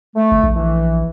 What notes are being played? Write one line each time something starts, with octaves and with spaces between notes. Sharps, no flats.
A3
G1
A#1
E3